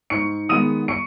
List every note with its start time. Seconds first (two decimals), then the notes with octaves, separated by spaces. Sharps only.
0.10 G#2 C#6 C#7
0.49 D#3 G#3 B3 D#6 D#7
0.88 C#6 C#7